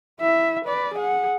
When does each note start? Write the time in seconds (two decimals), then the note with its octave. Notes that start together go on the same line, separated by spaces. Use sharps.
0.20 E4 E5
0.65 B4 D5
0.94 G#4 F#5